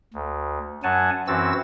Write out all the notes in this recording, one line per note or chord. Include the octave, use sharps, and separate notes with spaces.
D2
F#2 F#3 F#5 G#5 A5
F#2 E3 C4 F#4 E6 A6